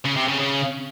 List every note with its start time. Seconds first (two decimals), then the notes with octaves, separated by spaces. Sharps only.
0.05 C#3
0.17 C3
0.28 C#3
0.39 C#3